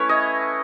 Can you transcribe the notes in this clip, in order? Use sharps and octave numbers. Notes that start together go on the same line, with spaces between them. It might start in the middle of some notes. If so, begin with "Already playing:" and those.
Already playing: A3 C#4 E4 B4 C#5
D#5